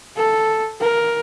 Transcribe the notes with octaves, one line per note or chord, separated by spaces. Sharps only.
A4
A#4